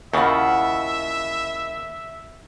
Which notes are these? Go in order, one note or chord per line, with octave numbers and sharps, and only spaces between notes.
D#2 C#3 E4 F4 E5 F#5